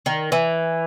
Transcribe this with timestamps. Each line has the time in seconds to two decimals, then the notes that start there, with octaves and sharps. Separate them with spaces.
0.06 D#3
0.32 E3